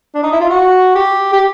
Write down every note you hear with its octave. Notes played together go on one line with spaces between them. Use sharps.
D4
D#4
E4
F4
F#4
G4
G4